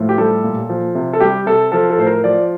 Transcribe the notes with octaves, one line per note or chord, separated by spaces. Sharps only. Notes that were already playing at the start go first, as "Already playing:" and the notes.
Already playing: A2 F3
G4
G3 A4
A#2
F3
C3
A4
G3 G4
C3 A4
F3 A4
A4
A2 C5
A#4
F3 D5